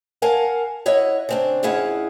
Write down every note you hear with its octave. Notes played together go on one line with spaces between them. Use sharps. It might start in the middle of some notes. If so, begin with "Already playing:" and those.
A#4 F5 F#5 G#5 A5
E4 C#5 D#5 E5 F#5
C#3 C4 D4
F2 C#4 E4 G#4 F5 F#5